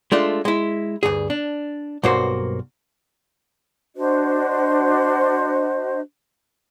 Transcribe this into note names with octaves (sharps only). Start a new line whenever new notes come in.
G#3 A3 D4 F4
G#3 E4
D2 G2 G#4
D4
B1 G2 A#3 F#4 C5
D4 F#4 C5 D#5